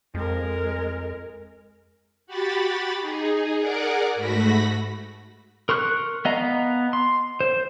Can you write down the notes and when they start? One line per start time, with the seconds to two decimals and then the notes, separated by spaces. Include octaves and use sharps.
0.15 F2 G#3 A#4
2.27 F#4 G4 B5 A6
2.99 D#4 G#4
3.59 G#4 A#4 D5 F#5 D6
4.15 G#2 A3 F#4 B5 A#6 B6
5.69 A#4 C6 C#6 F#6
6.25 B3 D#5 F5 A#5
6.93 C6
7.41 C5